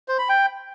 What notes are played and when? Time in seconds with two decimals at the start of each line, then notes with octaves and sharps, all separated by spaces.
0.08 C5
0.19 B5
0.29 G5